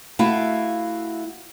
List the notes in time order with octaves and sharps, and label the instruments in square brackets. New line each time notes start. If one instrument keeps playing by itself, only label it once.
[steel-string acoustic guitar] A3 E4 F#4 F5